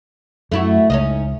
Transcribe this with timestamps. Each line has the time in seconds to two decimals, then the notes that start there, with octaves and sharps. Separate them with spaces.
0.52 F#2 A3 E4 F#4
0.90 C#2 C#4 D#4 D#5